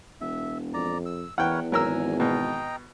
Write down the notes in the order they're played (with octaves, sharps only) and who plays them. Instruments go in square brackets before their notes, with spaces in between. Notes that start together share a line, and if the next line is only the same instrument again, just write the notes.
[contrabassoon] E1 [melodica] E5
[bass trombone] F2 [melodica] D5 A#5
[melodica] E6
[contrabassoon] E2 [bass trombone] E3 [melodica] A#4 B4 C#5 [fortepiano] F#5 G5
[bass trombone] G#1 [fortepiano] F#3 A#4 E6 [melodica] G#5
[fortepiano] B2 [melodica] D#5 G5 A#5